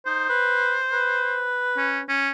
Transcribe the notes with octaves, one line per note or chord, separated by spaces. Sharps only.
D#4 C5
B4
B4
C#4
C#4